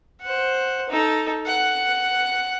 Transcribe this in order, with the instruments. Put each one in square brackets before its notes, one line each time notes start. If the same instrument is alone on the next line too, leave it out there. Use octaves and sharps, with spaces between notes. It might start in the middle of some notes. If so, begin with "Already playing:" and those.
[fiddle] C5 F#5
D#4 A4
F#5